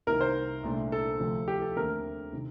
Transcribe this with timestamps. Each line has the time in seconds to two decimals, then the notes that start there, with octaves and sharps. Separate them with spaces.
0.07 C2 C3 D#3 A#3 A#4
0.21 C5
0.63 C2 A#2 A3 D4
0.92 A4
1.20 D2 C3 F3
1.48 G4
1.62 A4
1.76 D#2 D3 A3 C4 A#4
2.33 C3 D#3